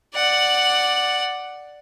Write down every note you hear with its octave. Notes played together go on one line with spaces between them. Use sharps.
D5 F#5